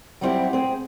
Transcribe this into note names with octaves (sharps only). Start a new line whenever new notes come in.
F#3 G3 B3 C4 E4 G4
C4 G#4